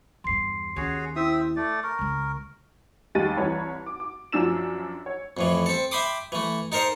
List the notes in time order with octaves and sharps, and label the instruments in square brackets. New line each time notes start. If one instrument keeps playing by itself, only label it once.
[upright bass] E2 G2 [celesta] C6 C7
[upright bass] D#2 C#4 [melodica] F#4 G#4 C#5
[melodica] C4 E5 D#6 [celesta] E4
[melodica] A3 D5
[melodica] A#4 [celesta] C#6
[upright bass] C#2 G#3
[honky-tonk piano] D#2 G3 G#3 A6 D#7
C2 E3 C#5 A5 B5
D6
D6
F#2 F3 D4 E6 E7
C#5
[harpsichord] F2 A2 E3
C4 A4
E5 G5 B5 C6 D6 D#6
E3 A3
D#4 A4 A#4 C5 D#5